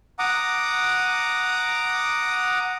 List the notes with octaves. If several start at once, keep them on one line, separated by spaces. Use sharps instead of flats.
F#5 A#5 D6 D#6